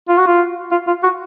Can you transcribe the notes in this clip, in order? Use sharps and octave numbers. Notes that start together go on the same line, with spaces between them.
F4
F#4
F4
F4
F4
F#4